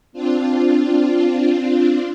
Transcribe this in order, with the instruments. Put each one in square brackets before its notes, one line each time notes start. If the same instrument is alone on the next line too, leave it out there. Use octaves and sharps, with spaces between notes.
[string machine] C4 D4 F4